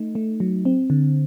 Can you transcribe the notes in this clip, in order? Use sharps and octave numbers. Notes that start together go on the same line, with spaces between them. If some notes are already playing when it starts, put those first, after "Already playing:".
Already playing: A3 D#4
A3
F#3
C4
D3